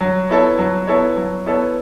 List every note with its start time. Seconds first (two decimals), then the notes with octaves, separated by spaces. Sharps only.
0.01 F#3
0.29 B3 E4 A4 C#5
0.59 F#3
0.87 B3 E4 A4 C#5
1.17 F#3
1.46 B3 E4 A4 C#5